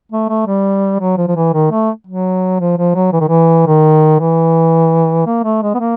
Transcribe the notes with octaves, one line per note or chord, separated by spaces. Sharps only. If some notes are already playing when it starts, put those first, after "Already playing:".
A3
A3
G3
F#3
F3
F3
E3
D#3
A3
F#3
F3
F3
F#3
E3
D#3
E3
D#3
E3
A#3
A3
G#3
B3
A#3